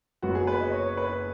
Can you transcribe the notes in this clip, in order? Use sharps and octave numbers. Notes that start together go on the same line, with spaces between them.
F#1 F#2 F#3 B3 F#4
G#4
B4
D#5
C#5
C#5
B4